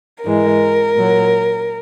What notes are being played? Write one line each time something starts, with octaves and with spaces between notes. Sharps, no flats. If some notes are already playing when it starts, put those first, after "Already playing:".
G#2 E3 G#3 A#4
A#2 F#3